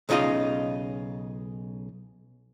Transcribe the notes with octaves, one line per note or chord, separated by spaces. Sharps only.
B1 C#3 D#4 F4 D#5